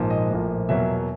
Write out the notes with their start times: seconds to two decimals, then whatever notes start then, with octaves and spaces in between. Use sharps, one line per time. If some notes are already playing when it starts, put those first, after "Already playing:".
Already playing: A#1 G#2 F3 A#3
0.10 D#5
0.30 A#1 A2 F3 A#3
0.69 E2 B2 F#3 A#3 E5